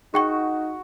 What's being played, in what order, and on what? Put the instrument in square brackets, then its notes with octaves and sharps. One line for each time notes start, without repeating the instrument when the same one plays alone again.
[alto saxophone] D#4 [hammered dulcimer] F#4 [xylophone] G#4 G5 C#6